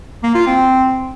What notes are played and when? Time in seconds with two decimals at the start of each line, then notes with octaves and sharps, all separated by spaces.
0.23 A#3
0.35 F4
0.47 C4